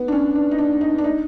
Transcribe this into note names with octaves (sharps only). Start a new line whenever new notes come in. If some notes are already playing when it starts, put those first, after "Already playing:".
Already playing: B3
D4
C#4
D4
D#4
D4
D#4
D4
D#4